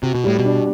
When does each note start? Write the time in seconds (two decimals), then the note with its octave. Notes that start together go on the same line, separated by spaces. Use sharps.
0.03 C3 F#4
0.15 B2
0.24 A2 G3
0.39 B2
0.45 D4